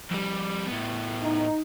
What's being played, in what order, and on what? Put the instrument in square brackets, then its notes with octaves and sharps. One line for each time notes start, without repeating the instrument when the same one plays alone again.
[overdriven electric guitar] F2 G3
A2 B3
[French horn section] D#4